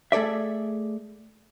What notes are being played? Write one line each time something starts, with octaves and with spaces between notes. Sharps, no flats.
A3 G#4 A4 D5 E5